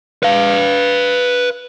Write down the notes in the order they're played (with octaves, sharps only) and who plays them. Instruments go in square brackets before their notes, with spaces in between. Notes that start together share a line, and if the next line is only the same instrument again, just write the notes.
[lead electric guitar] B4 F5